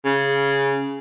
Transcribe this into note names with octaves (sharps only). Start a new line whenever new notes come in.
C#3